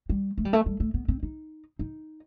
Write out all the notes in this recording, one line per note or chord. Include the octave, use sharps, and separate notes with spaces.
G3
A3
G3
A3
G3
A3
B3
C4
D#4
D#4